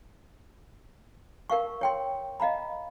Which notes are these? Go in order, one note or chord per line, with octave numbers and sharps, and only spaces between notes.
A#4 F5 C#6
C#5 G5 C6
D#5 F5 A#5 B5